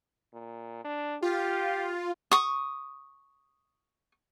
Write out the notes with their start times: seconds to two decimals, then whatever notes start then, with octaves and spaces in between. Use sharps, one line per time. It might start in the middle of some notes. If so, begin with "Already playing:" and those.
0.34 A#2
0.84 D4
1.22 F4 G4
2.32 C#6 D#6